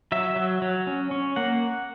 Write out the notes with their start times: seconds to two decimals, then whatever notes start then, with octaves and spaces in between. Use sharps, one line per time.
0.12 F#3 E5
0.36 F#3
0.62 F#3
0.87 C#4
1.11 C#4
1.36 A#3 F#5